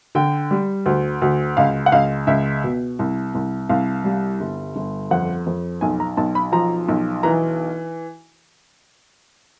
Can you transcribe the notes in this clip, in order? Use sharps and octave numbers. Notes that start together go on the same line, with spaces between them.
D3 G5
G3
D2
D2
C#2 F5
F#5
C#2 F5
C#2 E5
B2
C2
C2
C2 F5
G3
G1
G1
F2 F#5
F2
B1 G#5
A#5
B1 A5
B5
F3 A#5
B1
E3 A#5